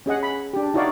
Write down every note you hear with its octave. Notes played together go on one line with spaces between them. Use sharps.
C#4 G#4 D#5 F#5
B5
D4 G4
D#4 E4 F#4 C#5 D5 F5